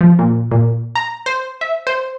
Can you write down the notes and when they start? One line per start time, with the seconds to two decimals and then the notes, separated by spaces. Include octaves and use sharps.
0.01 F3
0.19 A#2
0.52 A#2
0.95 A#5
1.26 C5
1.61 E5
1.87 C5